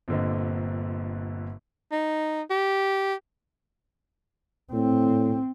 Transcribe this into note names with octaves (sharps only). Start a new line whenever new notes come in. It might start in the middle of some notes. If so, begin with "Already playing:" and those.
G1 A#2 D3 C4 D#5
D#4
G4
A2 C4